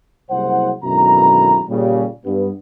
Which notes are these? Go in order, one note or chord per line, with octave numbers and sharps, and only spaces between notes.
F#1 C2 C5 F#5
G#1 F#2 B2 D3 E4 A#5
A#2 C#3 G3
G2 B3